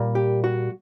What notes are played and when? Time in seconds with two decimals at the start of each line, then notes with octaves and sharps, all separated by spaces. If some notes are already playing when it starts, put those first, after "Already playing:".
Already playing: A#2 G3 A#3
0.15 G4
0.44 F#4